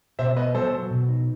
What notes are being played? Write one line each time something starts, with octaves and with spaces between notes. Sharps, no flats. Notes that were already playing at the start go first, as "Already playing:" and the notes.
B2 C5 E5
B3 B4 D#5
F#3 A4 C5
F#3
B2
D#4